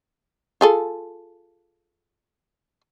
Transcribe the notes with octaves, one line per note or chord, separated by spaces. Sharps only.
F4 G#4 A4